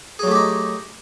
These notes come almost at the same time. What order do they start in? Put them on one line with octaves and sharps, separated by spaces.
G#4 F#3 A3 G4 D#4